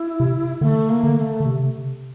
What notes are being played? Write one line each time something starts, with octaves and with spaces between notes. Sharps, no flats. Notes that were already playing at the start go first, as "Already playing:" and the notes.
Already playing: E4
C3
D3 A3
A#3
D3
A3
D3
C3